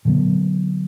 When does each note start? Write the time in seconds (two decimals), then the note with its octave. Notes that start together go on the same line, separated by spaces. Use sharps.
0.05 A#2 D3 F#3 B3